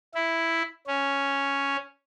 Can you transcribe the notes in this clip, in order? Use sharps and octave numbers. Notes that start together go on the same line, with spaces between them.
E4
C#4